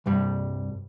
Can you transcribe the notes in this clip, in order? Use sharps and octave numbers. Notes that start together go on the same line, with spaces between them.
C2 G2 G3